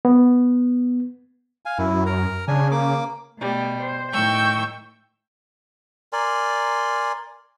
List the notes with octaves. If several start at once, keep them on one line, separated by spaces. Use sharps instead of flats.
B3
F5 G#5
F#2 E4
A#4 A#5
C#3 D4 G#5
A#3 D6
B2 G3 A3
C5
A2 D#3 G5 C#6 E6 G6
A#4 D5 G#5 C6